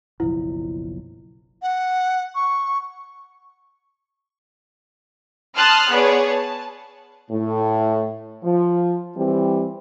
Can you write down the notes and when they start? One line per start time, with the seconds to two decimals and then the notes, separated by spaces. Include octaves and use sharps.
0.20 F#1 B1 F3 E4
1.62 F#5
2.35 C#6
5.57 A5 C6 D#6 F6 F#6
5.91 B3 G#4 C#5 D5
6.29 A5
7.30 A2
8.44 F3
9.17 E3 G3 C4